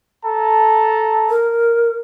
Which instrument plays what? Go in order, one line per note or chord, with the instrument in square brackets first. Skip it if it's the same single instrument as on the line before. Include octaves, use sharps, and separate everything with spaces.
[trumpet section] A4 A5 A#5
[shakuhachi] A#4